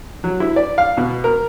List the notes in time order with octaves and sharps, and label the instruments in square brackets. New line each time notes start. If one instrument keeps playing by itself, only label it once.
[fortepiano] F#3
E4
D5
F5
B2
A#4